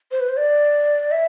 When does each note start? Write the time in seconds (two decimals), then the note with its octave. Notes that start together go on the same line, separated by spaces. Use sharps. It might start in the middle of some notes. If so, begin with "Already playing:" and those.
0.11 C5
0.20 B4
0.29 C5
0.37 D5
1.12 E5